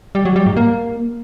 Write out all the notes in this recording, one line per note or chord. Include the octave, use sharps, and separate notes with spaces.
G3
F#3
G3
G#2
A#3